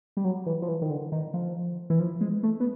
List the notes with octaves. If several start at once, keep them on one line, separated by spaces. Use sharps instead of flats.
G3
F#3
E3
F3
E3
D#3
D3
D#3
F3
E3
F3
G#3
A3
B3